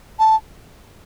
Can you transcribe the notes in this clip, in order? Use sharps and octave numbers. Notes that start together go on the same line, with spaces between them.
A5